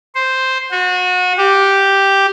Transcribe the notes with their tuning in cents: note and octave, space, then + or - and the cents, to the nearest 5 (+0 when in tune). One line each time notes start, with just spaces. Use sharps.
C5 +0
F#4 -30
G4 +0